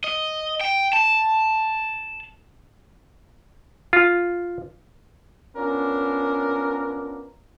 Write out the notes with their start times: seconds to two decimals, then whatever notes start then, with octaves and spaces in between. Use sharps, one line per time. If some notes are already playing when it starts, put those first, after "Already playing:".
0.04 D#5
0.61 G5
0.93 A5
3.93 F4
5.56 B3 C#4 D4 F4 A#4